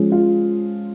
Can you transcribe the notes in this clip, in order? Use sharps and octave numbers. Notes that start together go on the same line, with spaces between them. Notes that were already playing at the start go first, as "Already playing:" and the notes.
Already playing: F3 G#3 C#4
F4